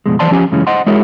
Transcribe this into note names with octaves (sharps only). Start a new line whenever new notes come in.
F2 B2 G#3
E3 C5 D5 A5 C6
F3 C#4 G4 G#5
F#2 C#3 E3 G#3 C#4
C5 D#5 F#5 C6
G#3 E4 F#4 G#4 A#4 C#5